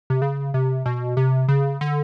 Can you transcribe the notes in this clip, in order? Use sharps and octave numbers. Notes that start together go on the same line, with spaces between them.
C3
C#3
C3
B2
C3
C#3
D3